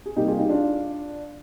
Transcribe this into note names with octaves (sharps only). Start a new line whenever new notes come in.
G#4
C3 G3 A#3 D#4 G4
F4 G#4
D#4 G4
D4 F4